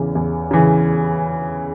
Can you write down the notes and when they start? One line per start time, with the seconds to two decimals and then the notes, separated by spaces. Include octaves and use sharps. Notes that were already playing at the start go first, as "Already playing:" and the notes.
Already playing: E2 C#3 E3
0.15 E2
0.51 C#3 E3